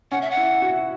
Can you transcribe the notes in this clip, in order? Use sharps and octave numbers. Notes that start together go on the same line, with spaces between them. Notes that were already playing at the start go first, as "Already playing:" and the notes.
C#4 F#5
E5
F#5
E4
F#4